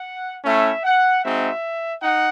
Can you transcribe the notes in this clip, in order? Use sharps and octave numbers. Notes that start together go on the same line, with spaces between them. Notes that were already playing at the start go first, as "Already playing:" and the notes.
Already playing: F#5
A3 C#4 E4 E5
F#5
G#3 C4 D#4 F#4 E5
D#4 F#5